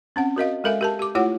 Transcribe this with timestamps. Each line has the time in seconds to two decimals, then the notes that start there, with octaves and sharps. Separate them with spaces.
0.16 C4 C#4 F#5
0.36 F#4 A#4 D#5 F5
0.64 G#3 A4 A#4 E5 F5 G#5
0.81 G4 A#4 A5
0.99 G4 D6
1.15 A3 E4 F4 G4 C#5 F#5